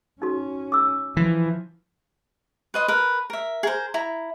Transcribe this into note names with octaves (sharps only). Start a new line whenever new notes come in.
C#4 D#4 F#4
D6 E6
E3 F3
B4 D#5 C6
A#4 B4
A#4 E5
G#4 A#4 C5
E4 A#5